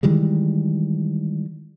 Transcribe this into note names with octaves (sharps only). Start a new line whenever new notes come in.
D#3 E3 G3 G#3